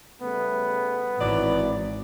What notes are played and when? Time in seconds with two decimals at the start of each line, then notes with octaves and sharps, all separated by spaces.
0.22 C#3 G3 A3 B3
1.21 G#1 E3 F#3 D5